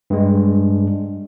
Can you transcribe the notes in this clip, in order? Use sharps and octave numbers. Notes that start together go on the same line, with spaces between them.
G2 G#3